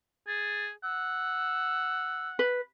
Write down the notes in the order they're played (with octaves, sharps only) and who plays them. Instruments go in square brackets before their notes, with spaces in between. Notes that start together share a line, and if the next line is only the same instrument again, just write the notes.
[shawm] G#4 [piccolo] A6
[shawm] F#5 [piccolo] E6
[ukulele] B4